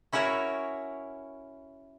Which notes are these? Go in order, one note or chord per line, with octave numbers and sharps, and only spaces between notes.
C#4 E4 F#4 A#4 C#5